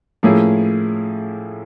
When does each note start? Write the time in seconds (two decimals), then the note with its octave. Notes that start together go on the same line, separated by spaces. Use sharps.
0.23 A2 F3 A#3 C#4 E4 G#4